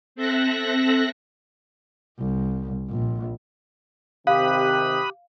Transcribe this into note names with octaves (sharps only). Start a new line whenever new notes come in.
C4 A4 E5 F#6 A#6
C2
A#1
C3 D#3 G4 F5 B5 D#6 F#6